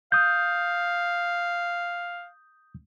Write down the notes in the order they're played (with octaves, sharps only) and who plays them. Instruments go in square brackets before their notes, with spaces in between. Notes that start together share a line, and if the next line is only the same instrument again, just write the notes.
[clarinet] F5 [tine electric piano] D#6 G6